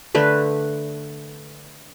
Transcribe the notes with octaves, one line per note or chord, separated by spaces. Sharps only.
D3 A3 B4